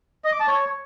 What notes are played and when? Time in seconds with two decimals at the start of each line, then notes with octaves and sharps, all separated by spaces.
0.24 D#5
0.32 D6
0.40 A5
0.48 C#5